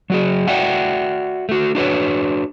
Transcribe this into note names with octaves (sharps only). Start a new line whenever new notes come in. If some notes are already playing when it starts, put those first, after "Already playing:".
F#3 F#4 G#4
F#4 D5 E5 F#5 G5
A3 F#4
D4 F#4 B4 C#5